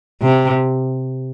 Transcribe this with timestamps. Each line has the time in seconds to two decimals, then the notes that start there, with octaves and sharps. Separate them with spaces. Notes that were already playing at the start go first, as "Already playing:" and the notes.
0.22 C3